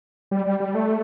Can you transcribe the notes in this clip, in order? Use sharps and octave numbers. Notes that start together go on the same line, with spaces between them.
G3
G3
G3
A3